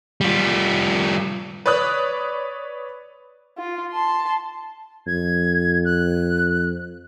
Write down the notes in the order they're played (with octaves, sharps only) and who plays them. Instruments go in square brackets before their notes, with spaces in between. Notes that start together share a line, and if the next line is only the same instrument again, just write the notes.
[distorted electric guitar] G3 F4
[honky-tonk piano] B4 C#5 D5 D#6 F#6
[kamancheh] F4
A5 C6
[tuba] F2 [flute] G#6
[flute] F#6